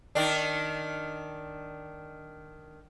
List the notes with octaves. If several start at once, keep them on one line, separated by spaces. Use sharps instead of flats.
D#3 D4